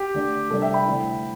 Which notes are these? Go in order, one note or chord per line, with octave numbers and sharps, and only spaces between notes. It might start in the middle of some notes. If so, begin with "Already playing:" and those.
Already playing: G4
D3 A3 D4
C3 G3 D4 A4
E5 G5
G5 B5
D3 A3 C4 E4